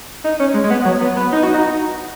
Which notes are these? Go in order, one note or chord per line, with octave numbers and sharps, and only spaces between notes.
D#4
C#4
G#3
G#3
B3
F#3
B3
B3
D#4
F#4
D#4